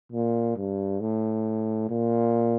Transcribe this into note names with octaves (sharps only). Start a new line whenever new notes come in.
A#2
G2
A2
A#2